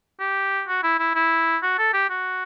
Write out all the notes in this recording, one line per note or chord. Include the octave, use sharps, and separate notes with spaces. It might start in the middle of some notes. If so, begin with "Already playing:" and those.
G4
F#4
E4
E4
E4
F#4
A4
G4
F#4